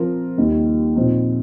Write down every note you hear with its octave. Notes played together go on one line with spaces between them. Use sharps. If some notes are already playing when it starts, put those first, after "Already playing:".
Already playing: F3 C4 F4 A#4
D#2 D#3 G3
A#2 F3 C4 D#4